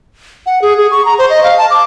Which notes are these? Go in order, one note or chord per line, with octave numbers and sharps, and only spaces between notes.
F#5
G#4
G#4
C#6
A#5
C5
D#5
F5
A5
D6